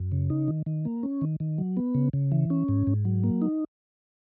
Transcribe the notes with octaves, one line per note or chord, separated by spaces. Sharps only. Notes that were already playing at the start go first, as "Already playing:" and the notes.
Already playing: F#2
C#3
D#4
D#3
D#3
A#3
C#4
D#3
D#3
F#3
B3
C#3
C#3
E3
C#4
G#2
G#2
F#3
A#3
D#4